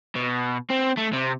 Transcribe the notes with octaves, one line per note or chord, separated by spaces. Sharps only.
B2
C4
A3
C3